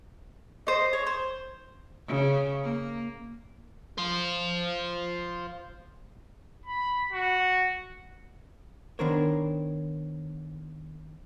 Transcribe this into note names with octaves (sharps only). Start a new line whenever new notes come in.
C5 D#5
C#5
C5
C#3
A#3
F4 C5
B5
F#4
D#3 B3 D4 A#4 C5 C#5